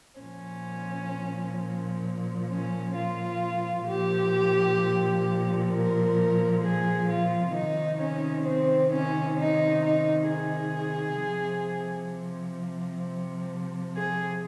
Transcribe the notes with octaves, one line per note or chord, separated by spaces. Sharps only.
A#2 F3 C#4
C#4
F4
A#2 F3 G4
A#4
G#4
F4
C3 D#3 D#4
C#4
C4
C#4
D#4
D#4
G#4
C3 F3
G#4